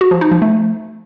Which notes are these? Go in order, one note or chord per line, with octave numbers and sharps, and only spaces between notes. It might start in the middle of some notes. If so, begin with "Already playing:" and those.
F#4
F3
D#4
F3
A3